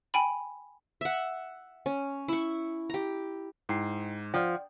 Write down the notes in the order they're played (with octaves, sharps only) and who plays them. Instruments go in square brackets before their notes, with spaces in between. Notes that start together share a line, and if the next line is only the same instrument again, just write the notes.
[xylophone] G5 G#5 B5
[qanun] E5 F#5
C#4
E4 C#6
G4 A#5
[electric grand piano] G#2 [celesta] E4 G5 C7
[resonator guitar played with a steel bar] F3 [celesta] D5 G5 [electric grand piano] F#5